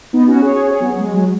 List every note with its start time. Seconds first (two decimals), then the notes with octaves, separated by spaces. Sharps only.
0.13 B3 D#4
0.27 C#4 F#4
0.42 G#4 C#5
0.70 G#4 C#5
0.80 F#3 B3
0.91 F#3
1.00 G#3
1.14 F#3